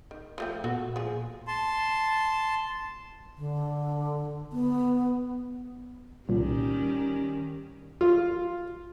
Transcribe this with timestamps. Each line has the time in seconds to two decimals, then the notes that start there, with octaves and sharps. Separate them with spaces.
0.11 D#3
0.38 F3 A3 G5
0.64 A#2 B3 F#4 A4
0.96 F3 G#4
1.47 A5 C6
3.38 D3
4.53 B3
6.29 C2 A#2 D#3 G3 C#4
8.01 F4